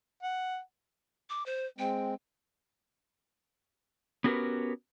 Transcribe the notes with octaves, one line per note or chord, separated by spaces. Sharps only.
F#5
D6
C5
G#3 C4 G5
B3 C#4 F#4 G4 A#4 B4